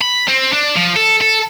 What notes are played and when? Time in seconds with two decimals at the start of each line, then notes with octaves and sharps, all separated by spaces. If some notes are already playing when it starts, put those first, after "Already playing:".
0.01 B5
0.28 C4
0.53 D4
0.76 F3
0.96 A4
1.21 A4